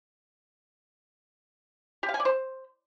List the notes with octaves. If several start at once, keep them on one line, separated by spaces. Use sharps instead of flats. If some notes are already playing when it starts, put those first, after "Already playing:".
G4
F5
G#5
D5
C5